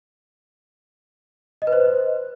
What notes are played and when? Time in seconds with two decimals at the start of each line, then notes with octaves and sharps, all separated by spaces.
1.62 D#5
1.67 B4
1.73 C5